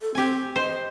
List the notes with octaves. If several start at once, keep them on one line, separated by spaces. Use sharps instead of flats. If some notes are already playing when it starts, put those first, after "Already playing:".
A4
C4 G4 G#5
C5 D#5